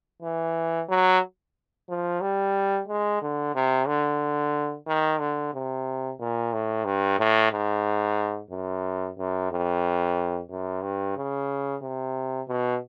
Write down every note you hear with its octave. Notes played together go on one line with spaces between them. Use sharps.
E3
F#3
F3
G3
G#3
D3
C3
D3
D#3
D3
C3
A#2
A2
G2
A2
G#2
F#2
F#2
F2
F#2
G2
C#3
C3
B2